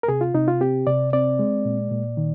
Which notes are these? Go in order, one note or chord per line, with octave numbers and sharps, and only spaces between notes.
A#4
C3 G#4
F4
C3 D#4
F4
C4 G4
C3 D5
C4 D5
G#3
A#2
A#2
D#3